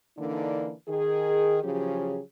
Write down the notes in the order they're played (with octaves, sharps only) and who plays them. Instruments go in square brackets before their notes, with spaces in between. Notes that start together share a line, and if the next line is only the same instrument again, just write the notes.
[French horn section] D3 E3 A#3 D4 D#4
D#3 G#4
C#3 F3 F#3 C#4 G4 G#4